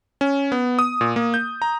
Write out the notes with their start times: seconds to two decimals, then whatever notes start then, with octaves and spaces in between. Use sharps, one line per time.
0.21 C#4
0.52 B3
0.79 D#6
1.01 A#2
1.16 A#3
1.34 G6
1.62 A#5